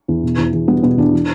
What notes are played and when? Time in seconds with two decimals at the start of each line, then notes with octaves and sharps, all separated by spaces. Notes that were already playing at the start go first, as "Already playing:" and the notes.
0.08 E2
0.23 B2
0.38 E2
0.53 E2
0.68 G3 B3
0.83 B2 B3
0.98 E2 D4
1.13 E3